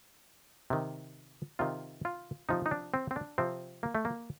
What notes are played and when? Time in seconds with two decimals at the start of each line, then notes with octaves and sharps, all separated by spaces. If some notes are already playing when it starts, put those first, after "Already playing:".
0.70 C3 D#3
1.59 C3 D#3 F4
2.05 F4
2.49 C3 F3 D#4
2.66 D#4
2.71 D4
2.94 C4
3.11 C4
3.16 D4
3.38 C3 F3 C4
3.83 A#3
3.95 A3
4.05 A#3